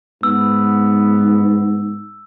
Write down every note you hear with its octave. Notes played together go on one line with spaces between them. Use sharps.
G#2 B3 E6